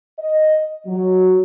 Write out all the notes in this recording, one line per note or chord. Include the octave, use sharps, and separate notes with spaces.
D#5
F#3